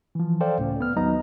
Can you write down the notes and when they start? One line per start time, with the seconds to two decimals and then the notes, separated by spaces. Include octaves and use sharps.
0.15 E3 F3
0.41 A4 C5 D5 F5 G5
0.58 C#2 A2 C#4
0.80 B3 F6
0.96 D#2 F#3 B3 D#4 D#5 A#5